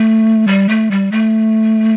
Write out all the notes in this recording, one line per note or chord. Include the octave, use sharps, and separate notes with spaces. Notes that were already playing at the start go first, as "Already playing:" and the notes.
Already playing: A3
G3
A3
G3
A3